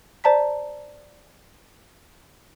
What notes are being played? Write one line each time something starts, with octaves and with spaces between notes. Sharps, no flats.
C5 D5 A5 A#5 B6